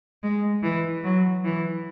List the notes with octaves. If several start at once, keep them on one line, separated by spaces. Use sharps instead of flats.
G#3
E3
F#3
E3